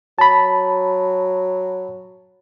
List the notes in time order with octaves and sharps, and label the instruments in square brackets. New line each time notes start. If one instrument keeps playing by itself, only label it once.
[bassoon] F#3 [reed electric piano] A5 B5